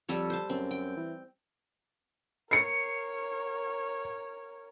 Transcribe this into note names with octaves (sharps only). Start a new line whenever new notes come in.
F2 G3 A4 C#5
C5 A5
F#2 C4
G5
E3
A#4 C#5 C7 C#7